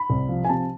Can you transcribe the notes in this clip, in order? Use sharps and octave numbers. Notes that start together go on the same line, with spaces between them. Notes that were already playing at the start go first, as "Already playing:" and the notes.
Already playing: B5
C2
F3
G#5
C3 A5